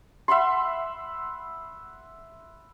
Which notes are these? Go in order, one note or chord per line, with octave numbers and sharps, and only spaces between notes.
E5 F#5 B5 C6